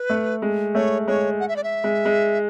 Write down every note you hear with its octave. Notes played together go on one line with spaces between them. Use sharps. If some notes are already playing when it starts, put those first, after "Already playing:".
Already playing: B4
A3
G#3
A3 C#5
G#3 C#5
F#5
E5
D5
E5
G#3
G#3